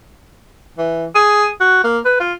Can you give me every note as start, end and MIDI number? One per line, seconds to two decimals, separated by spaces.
0.78 1.07 52
1.15 1.48 68
1.60 1.81 66
1.84 1.99 58
2.05 2.18 71
2.20 2.34 65